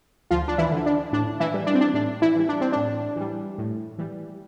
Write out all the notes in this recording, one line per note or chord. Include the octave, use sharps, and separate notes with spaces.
D2 F3 F4
D4
E3 E4
D3 F3
D4
A2 D4
E3 E4
E3 G3
D4
C4
D4
A2 D4
E3 E4
E3 G3
D4
C4
A2 D4
E3 G3
A2
E3 G3